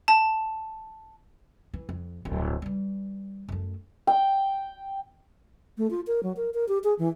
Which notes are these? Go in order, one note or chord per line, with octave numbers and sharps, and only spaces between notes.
A5
E3
F2
D1 B1
E3 G3
F#2 A3
G5
A3
F4
A#4
F#3
A#4
A#4
G4
G#4
E3